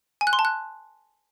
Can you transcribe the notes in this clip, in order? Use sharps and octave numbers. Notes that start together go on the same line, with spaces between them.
G#5
F#6
C6
A5
F#6